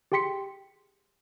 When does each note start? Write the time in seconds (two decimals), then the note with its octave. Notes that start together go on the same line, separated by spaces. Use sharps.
0.12 G4 G#4 G5 C6 B6 C#7